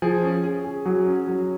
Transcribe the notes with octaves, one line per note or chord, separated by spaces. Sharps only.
F3 G#4
C#4
G#4
G#4
F#3 G#4
C#4
F#3